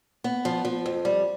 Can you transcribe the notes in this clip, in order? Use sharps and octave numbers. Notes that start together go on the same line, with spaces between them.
B3
F3
F3
F2
G3